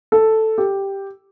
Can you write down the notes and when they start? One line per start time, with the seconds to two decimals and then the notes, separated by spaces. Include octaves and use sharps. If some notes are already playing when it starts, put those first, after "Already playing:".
0.12 A4
0.58 G4